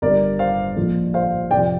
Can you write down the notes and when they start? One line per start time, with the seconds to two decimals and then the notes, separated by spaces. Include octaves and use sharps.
0.02 G1 G2 G3 A#4 D5
0.39 C5 F5
0.77 A#1 A#2 F3
1.14 C5 F5
1.51 F2 C3 F3 D5 G5